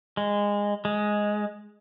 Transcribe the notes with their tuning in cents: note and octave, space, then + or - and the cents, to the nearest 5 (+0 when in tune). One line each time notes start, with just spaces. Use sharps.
G#3 -20
G#3 +5